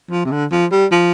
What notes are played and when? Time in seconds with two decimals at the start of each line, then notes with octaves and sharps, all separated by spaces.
0.11 F3
0.25 C3
0.32 D3
0.52 F3
0.72 G3
0.92 F3